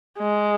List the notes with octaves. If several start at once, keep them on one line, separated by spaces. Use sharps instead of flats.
G#3